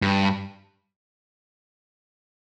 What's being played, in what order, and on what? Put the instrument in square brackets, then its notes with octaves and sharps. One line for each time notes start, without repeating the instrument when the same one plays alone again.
[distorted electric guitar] G2